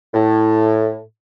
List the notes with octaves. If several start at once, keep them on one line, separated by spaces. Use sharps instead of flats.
A2